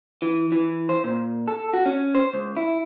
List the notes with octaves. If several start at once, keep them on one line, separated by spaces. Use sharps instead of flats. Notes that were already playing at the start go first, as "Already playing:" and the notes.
E3
E3
C5
A#2
A4
F#4
C#4
C5
C#2
E4